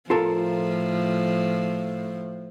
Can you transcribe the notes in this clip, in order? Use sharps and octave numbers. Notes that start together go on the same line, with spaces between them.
A2 F3 F4 A4 A#4